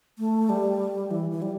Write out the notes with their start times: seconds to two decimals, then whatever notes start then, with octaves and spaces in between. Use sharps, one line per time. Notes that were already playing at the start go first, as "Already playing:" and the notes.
0.19 A3
0.49 G3
1.11 E3
1.31 E3
1.42 G3